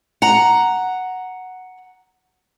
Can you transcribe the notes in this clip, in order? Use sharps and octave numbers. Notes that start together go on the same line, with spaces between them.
F#5 A#5